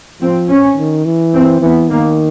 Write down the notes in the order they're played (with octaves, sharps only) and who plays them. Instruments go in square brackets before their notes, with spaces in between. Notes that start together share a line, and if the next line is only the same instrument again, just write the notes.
[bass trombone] F3 [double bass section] C4
[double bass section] C#4
[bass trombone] D#3
E3
[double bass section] C4
[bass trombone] E3 [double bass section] B3
[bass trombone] D#3 [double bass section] A#3